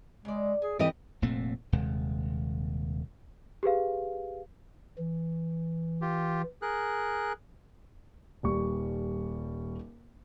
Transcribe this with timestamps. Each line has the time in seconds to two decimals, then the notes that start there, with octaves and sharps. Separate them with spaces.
0.25 C#3 G#3 D5
0.62 G#4 G#5
0.79 F2 E3 G4 D#5
1.22 F1 A#2 A3 C4
1.72 D#1 D#2 C3 G#3
3.63 G4 G#4 B4 F5
4.98 E3
6.02 F4 G4
6.62 G#4 A#4 F#6
8.43 D#1 G3 C#6